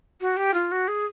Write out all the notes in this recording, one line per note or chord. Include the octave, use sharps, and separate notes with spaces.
F#4
G4
F4
F#4
G#4